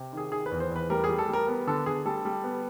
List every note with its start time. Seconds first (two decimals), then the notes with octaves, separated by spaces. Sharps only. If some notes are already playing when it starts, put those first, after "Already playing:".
Already playing: C3
0.13 D#3 G#4
0.31 D#3 G#4
0.46 B4
0.51 E2
0.60 C5
0.71 E2 B4
0.90 G3 A#4
1.04 G#4
1.09 G3
1.18 A4
1.29 G3 A#4
1.48 B3
1.67 D3 A4
1.86 D3 G#4
2.05 G3 A4
2.25 G3
2.44 B3